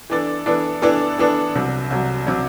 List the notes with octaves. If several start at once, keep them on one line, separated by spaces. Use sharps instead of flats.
E3 B3 D4 A4 D5
E3 B3 D4 A4 D5
E3 B3 D4 A4 D5
E3 B3 D4 A4 D5
C2 C3 F#3
C2 C3 F#3
C3 F#3